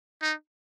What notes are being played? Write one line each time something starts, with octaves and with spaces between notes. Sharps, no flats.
D#4